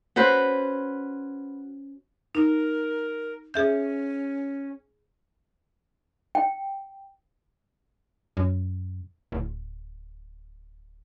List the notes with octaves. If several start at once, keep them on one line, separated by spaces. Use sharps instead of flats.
C#4 F#4 B4 C5
D#4 A#4
C#4 G#4 E5 G6
G5
F#2
D1